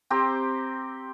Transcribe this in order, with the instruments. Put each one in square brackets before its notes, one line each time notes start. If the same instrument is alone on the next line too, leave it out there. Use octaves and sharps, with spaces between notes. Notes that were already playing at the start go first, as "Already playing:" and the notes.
[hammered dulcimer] C4 G4 C5 A#5